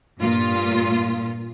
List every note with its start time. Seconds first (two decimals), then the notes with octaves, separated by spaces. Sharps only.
0.19 G2 A#2 F4